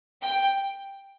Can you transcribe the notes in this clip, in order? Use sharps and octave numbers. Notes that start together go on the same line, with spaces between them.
G5